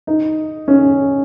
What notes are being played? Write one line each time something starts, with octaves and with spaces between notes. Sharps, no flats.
D#4
C#4